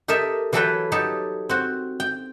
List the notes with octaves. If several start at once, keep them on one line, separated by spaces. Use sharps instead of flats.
G4 A4 A#4 D#5 E5
E3 F#3 E4 A4 B4 G5
F#3 D#4 G4 A4
C4 F#4
G5